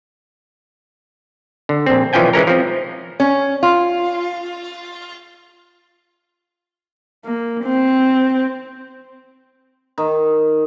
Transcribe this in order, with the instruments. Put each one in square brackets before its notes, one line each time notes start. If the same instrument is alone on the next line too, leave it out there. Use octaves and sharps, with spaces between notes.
[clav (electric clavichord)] D3
A#1 C4
B1 E3 F3 C#4 G5 G#5
E3 G#3 C#4 A#4
F3 C4
[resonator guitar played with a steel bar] C#4
F4
[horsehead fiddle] A#3
C4
[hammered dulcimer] D#3